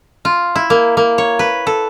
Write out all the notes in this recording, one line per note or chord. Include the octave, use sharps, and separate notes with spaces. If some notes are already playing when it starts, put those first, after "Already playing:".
F4
E4
A#3
A#3
C#5
B4
A4